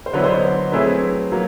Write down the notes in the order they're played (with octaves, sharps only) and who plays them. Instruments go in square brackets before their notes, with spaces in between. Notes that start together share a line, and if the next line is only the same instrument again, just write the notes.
[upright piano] C5
[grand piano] D3 F#3 B3 E4 [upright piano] B4 C#5
[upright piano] C5 D5
C#5 D#5
[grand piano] F#3 A3 C4 E4 G#4 [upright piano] B4 C#5
[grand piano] F#3 A#3